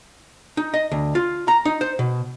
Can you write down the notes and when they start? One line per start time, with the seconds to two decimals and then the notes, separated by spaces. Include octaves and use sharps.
0.57 D#4
0.74 D#5
0.91 D2
1.15 F4
1.48 A#5
1.65 D#4
1.81 C5
1.99 B2